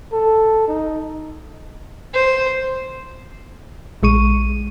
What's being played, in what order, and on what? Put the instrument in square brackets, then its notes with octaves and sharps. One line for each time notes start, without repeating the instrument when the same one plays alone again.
[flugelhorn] A4
D#4
[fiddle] C5
[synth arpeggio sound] A#1 G#3 C#6 D#7